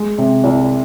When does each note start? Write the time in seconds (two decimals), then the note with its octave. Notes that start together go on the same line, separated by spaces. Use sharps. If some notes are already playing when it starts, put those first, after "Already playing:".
Already playing: G#3
0.18 C3
0.44 C2